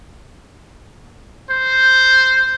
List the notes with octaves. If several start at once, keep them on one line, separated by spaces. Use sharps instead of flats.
C5